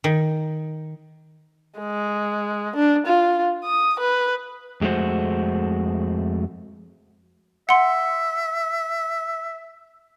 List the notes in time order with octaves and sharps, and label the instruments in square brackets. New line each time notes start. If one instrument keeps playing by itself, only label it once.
[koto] D#3
[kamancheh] G#3
D4
F4
D#6
B4
[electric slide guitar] F2 G#3 A3 F#4 C5
[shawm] E5 [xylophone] F#5 C6